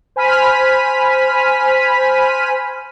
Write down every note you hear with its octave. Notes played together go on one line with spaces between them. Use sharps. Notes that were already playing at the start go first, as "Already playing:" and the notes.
C5 G#5 B5 F6 B6 D#7